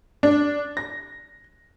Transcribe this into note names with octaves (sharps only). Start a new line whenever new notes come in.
D4
A#6